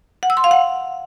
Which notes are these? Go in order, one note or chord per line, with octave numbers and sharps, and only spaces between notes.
F#5
E6
C6
F5
F#5